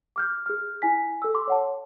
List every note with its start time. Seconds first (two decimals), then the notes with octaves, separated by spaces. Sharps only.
0.16 D6 F6 G6
0.46 G#4 F6
0.82 E4 G#5 B6
1.22 A4 E6
1.34 C6 D6
1.47 C#5 F#5 A5